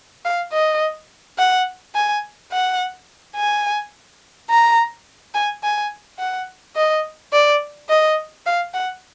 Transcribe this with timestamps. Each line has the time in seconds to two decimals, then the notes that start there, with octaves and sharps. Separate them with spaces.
0.25 F5
0.53 D#5
1.38 F#5
1.95 G#5
2.52 F#5
3.36 G#5
4.50 A#5
5.34 G#5
5.63 G#5
6.19 F#5
6.76 D#5
7.33 D5
7.89 D#5
8.46 F5
8.74 F#5